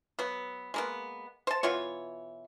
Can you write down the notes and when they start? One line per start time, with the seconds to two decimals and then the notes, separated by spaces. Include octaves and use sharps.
0.19 F#3 B3
0.74 G#3 A#3 B3
1.47 C5 A5
1.63 B2 E3 F4 C#5